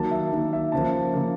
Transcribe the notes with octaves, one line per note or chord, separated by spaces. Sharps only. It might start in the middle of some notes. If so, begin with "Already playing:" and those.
Already playing: D#3 F#3 A#3 A5
E5
D#3 F#3 A#3
E5
C#3 F3 A#3 A5
C#3 F3 A#3